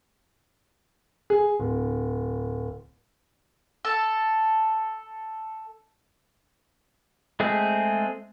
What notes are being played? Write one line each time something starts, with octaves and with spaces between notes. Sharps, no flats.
G#4
D1
A4 A5
G#3 A3 C4 G#4